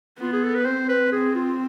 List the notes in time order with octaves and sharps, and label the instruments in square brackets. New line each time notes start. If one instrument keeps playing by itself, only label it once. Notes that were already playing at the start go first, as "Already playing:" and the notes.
[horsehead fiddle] B3 [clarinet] F4
[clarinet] G#4
A4
B4
[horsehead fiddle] C4 [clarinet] C5
[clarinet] B4
[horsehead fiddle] C4 [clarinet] G#4
[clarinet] F4